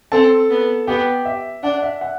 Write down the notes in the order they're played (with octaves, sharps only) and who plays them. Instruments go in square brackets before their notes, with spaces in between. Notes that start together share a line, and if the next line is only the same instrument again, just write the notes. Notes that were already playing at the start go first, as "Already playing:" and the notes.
[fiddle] C4 [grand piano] A4 A5
[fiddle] B3
[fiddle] B3 [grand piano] G4 G5
[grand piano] E5
[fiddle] D4 [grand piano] F#5
[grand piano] E5
F#5